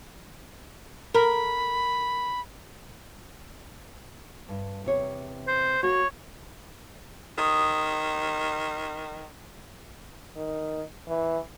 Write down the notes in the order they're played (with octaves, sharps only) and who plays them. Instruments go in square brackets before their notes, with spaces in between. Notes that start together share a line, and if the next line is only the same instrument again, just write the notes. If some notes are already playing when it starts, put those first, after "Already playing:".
[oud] A#4 [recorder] B5
[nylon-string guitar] G2
E2 C3 C#5
[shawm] C5
[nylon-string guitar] A#3 F#4 [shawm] C#5
[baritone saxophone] D#3 [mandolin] D#6
[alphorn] D#3
E3